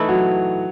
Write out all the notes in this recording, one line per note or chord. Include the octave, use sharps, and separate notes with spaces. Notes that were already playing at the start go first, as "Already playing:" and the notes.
Already playing: E3 A3 D#4 E4
F#3 F#4